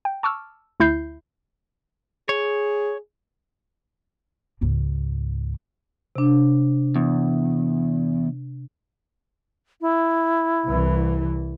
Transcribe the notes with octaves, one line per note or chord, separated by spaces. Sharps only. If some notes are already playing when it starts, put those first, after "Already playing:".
G5
A5 C#6 D6 E6 F6
D2 E4 G6 C7
G#4 C#5
C#2 G#2
C3 D4
E2
E4
C2 E3